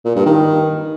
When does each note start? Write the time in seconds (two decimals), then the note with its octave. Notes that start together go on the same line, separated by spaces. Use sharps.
0.05 A#2
0.16 G2
0.26 D#3